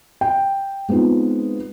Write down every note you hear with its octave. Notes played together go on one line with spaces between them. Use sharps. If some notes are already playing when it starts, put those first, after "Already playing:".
G5
G#3 B3 C4 D#4 F4